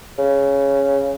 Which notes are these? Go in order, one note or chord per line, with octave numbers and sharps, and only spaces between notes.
C#3